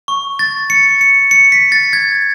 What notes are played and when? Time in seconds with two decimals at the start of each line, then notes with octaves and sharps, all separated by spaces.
0.08 C#6
0.39 A6
0.70 C#7
1.01 C#7
1.31 C#7
1.52 B6
1.72 A6
1.93 G#6